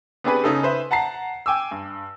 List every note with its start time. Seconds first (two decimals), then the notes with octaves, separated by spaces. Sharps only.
0.24 B3 C4 D4 G4 G#4 B4
0.44 C#3 D#4 G#4 A4
0.63 B4 C5 E5
0.91 F#5 A5 A#5 C7
1.46 G5 G#5 D6 E6
1.71 G2